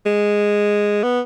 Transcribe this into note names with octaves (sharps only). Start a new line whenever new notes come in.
G#3
B3